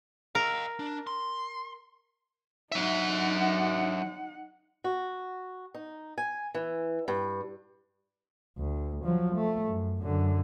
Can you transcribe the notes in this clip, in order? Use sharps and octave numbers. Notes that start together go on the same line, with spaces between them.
A#4 D#5 F5
D4
C6
F#3 D#4 E5 F#5
F#4
D#4
G#5
E3
G2
D2
F3 F#3
A3
F#2
F#2 D3